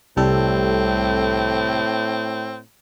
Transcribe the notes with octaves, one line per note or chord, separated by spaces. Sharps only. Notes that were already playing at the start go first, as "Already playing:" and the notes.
C2 A2 G3 C4 A4